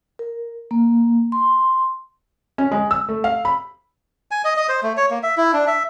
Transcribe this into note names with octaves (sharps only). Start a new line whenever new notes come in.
A#4
A#3
C6
C#4
G#3
E6
A3
F5
B5
G#5
D#5
D#5
C5
A3
C#5
A#3
E5
E4
D4
E5